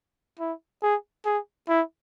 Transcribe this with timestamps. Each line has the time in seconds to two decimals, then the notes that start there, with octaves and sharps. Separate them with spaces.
0.40 E4
0.83 G#4
1.25 G#4
1.69 E4